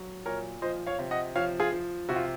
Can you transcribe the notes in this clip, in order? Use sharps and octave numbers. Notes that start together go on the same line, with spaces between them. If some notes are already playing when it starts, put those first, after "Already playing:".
Already playing: F#3
A#2 A#4 C#5
F3 C5 D#5
C#5 F5
C3
D#5 F#5
F3 C#5 F5
F4 G#4
F3
C3 F#4
F4